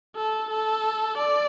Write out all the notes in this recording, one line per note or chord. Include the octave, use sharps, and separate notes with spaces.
A4
A4
D5